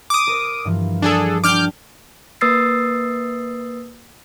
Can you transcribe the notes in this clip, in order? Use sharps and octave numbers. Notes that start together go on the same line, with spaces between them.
D6 D#6
A#4 C5
G2 E3 F3
D4 G#4 A4
D4 G5 D6 F6 G6
A#3 B4 D#6 E6 A6 C7